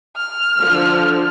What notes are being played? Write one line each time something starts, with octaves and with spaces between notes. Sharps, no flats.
F6
D3 F3